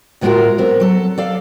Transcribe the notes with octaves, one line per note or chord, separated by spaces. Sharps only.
D2 A2 G#3 F4 F#4 A#4
B3 C4 A#4
F#3 A4
A4 D5 F5